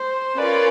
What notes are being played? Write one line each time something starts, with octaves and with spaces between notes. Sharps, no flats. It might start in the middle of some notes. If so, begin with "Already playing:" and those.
Already playing: C5
C#4 F4 A#4 B4 D5